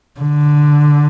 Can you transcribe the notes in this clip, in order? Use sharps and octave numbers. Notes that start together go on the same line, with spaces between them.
D3